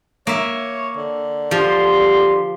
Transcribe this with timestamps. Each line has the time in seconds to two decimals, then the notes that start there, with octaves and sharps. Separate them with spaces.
0.27 A#3 C#5 E5
0.97 D3
1.51 F3 G4 C6